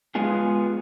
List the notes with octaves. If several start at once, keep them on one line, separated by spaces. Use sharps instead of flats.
G#3 B3 F4 G#4